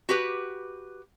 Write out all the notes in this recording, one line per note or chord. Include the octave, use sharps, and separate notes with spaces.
F#4 G4 B4